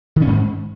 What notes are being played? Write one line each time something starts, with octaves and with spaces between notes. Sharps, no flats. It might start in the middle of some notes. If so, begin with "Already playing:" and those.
D#3
C#4
G#2